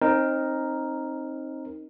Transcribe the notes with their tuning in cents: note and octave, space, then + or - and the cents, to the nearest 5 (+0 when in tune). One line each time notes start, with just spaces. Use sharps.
C4 +30 D#4 +0 A#4 +0